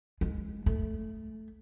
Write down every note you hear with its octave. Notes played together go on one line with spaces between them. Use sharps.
G#3
A3